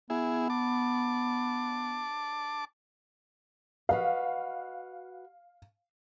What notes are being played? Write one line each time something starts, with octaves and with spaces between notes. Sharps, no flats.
B3 E4 G#4
A5 D6
F#4 B4 D#5 F5